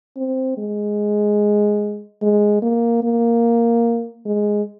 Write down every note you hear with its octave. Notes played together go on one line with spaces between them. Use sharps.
C4
G#3
G#3
A#3
A#3
G#3